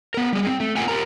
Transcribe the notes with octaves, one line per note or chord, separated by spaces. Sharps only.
B3 A#4
G3 G#3
C4
A3
B3 F4 A#4 F#5 G#5
F4 G4 A#4 A#5